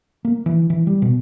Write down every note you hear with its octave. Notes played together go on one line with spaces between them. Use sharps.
A#3
E3
E3
G3
B2